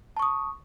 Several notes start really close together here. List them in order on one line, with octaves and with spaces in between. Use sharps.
A5 C#6 D#6